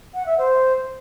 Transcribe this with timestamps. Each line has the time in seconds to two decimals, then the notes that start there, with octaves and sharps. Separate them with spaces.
0.14 F#5
0.26 E5
0.38 C5